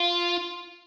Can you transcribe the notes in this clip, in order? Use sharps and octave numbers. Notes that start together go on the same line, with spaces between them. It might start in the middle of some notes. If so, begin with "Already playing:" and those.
Already playing: F4